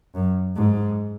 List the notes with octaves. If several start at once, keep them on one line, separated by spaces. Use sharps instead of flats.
F#2
G#2